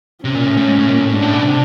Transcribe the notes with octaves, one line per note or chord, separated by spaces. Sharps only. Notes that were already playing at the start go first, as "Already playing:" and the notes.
C3 C#4
A#2
A2
A2
G#2
A2
A#2
A2
G#2 D4
A2
B2
C3